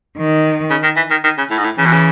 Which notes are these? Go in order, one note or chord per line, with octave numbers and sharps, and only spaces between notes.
D#3
C#3
D#3
E3
D#3
D#3
C#3
A2
G#2
A2
C#3 E3
B2
C#3